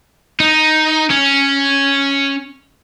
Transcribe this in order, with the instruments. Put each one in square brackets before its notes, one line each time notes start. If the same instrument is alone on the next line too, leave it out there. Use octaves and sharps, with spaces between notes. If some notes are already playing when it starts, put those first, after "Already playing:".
[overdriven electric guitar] D#4
C#4